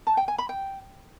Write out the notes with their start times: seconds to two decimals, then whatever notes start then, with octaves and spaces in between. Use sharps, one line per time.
0.07 A5
0.17 G5
0.28 G#5
0.38 B5
0.49 G5